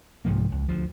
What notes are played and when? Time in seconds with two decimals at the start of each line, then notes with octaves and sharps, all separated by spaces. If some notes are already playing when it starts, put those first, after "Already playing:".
0.25 C2 G#2 F3 A#3
0.52 C#2
0.69 D2 F3